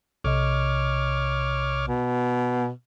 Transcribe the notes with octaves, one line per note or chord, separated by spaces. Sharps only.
B1 C3 C#5 D#5 D6 F6
B2